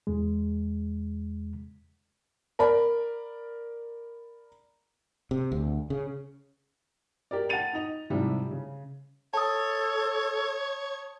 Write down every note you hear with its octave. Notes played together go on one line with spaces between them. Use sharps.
E2 G#3
A#4 D5 B5
C3
D2
C#3
G4 A#4 D5
F#5 G5 A5 A6 D#7 F7
D#4 D#5 F7
G#2 C3 F3 G3 E4 G4
C#3
A4 C#5 A5 D#6